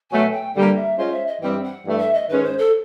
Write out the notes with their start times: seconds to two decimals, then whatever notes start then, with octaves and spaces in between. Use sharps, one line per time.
0.10 B2 F#3 A3 G#5
0.32 G5
0.54 G2 D3 G3 A#3 F#5
0.76 E5
0.98 G#3 C#4 F4 G#4 C5 D#5
1.12 E5
1.27 D#5
1.41 G2 E3 G3 C4 G5
1.63 F#5
1.85 G2 E3 A3
1.99 E5
2.14 D#5
2.29 G#2 D#3 G#3 C#4 B4
2.43 C5
2.58 A4